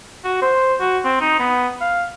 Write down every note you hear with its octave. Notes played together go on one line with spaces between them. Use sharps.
F#4
C5
F#4
C4
D#4
B3
F5